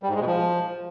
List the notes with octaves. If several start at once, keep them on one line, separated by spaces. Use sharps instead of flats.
G3
G#2
G#3
B2
F3